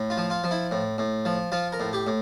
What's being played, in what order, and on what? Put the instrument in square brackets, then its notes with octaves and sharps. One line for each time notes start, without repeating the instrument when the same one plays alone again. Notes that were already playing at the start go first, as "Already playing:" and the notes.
Already playing: [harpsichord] A2
F4
F3
F4
F3
E4
A2
A2
F3
F3 F4
A#4
A2
G4
A2